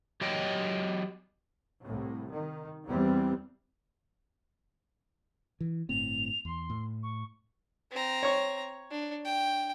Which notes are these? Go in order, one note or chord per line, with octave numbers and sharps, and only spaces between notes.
F#3 G4 C#5 D#5 G5
C2 A2
D#3
E2 E3 G3 C4
E3
G1 A2 C4 F7
E2 C6
A2
C#6
C4 A#5
C#5 C#6
D4
G5